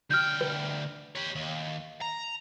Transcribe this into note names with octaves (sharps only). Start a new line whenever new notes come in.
D2 G5 F6 G6
B4
G4 C#5
D#2
A#5